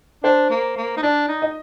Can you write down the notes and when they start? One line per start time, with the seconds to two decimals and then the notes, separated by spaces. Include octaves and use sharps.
0.24 D4 C5
0.50 A#3
0.77 A#3
0.97 D#4
1.03 D4 D5
1.29 D#4
1.42 D#5